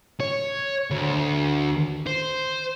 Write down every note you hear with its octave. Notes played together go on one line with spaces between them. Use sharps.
C#5
D2
C5